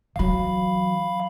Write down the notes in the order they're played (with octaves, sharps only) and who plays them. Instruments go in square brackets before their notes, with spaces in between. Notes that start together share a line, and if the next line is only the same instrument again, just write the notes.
[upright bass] E3 F#3 [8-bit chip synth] F5 B5